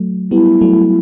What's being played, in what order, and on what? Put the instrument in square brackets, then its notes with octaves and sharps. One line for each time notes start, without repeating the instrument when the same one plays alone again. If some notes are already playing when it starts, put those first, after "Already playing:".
Already playing: [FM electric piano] F#3 A3
[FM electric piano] G3 B3 [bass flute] E4
[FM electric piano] F#3 A3